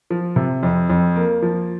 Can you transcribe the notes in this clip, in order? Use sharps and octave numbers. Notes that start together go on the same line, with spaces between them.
F3
C3
F2
F2
A#3
F3